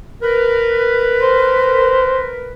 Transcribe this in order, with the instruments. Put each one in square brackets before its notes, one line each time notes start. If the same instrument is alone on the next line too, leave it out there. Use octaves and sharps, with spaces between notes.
[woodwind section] A#4 B4
[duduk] C5